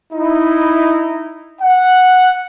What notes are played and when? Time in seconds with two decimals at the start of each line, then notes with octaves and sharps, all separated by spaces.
0.13 D#4 E4
1.61 F#5